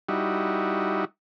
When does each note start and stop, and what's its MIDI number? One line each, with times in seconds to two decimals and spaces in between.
0.09 1.05 55
0.09 1.05 63
0.09 1.05 64
0.09 1.05 66